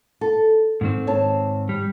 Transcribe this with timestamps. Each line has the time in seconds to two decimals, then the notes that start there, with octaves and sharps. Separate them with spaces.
0.21 A4
0.81 G#2 D#3 C4
1.07 C#5 A5
1.69 G3